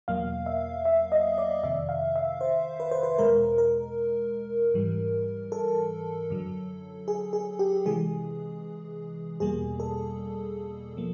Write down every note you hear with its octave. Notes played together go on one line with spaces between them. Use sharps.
E2 B2 F#3 A#3 F5
E5
E5
D#5
D5
F2 C3 D#3 E5
F5
E5
C5
B4
C5
B4
E2 B2 G#3 A#4
A#4
G#2 E3 G3
A4
F#2 D3 F#3
G#4
G#4
G4
C3 E3 G#3 G#4
E2 B2 G3 A#3 G#4
A4
F3 A#3